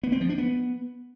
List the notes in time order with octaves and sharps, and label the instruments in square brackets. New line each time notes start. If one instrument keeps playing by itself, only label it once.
[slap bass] B3
C4
F3
D4
B3